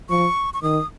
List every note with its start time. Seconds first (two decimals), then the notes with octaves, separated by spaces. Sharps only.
0.09 F3 C#6
0.54 C#6
0.62 D#3 D#6